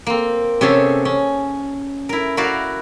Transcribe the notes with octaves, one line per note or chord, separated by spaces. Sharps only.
A#3 C4
C3 C#4 G#4 A4 C#5 E5
C#4
E4 A#4
E4 F#4 A#4 D5 F5